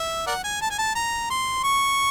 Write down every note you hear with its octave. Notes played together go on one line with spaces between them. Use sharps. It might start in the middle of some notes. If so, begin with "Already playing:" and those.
Already playing: E5
A#4 D5 F#5
G#5
A5
G#5
A5
A#5
C6
C#6